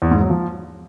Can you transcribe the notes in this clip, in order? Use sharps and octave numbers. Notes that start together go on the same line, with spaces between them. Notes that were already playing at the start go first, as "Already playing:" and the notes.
E2
G#2
F#3
F3